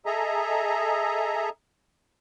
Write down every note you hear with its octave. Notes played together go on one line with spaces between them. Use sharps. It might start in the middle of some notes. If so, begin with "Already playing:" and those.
G#4 A4 D#5 E5 A#5